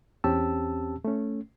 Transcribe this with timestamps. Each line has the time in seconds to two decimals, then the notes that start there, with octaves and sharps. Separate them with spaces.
0.24 E2 C4 C#4 G4 A5 E6
1.05 A3 C#4